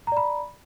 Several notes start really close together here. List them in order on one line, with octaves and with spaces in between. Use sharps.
A#5 D5 B5